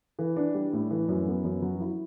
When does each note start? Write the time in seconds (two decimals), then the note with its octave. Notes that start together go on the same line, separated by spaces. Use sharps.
0.19 E3
0.37 D4
0.54 G3
0.73 A2
0.90 E3
1.08 F#2
1.26 B3
1.44 F#2
1.62 F#3
1.80 E4